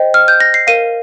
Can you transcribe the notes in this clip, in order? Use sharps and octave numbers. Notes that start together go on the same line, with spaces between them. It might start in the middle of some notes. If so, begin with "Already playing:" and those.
Already playing: C5 D#5 G5
F6
G6
A#6
C7
A#4 F5 D#7